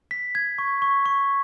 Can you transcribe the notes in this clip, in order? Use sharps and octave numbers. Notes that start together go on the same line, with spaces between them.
B6
G#6
C#6
C#6
C#6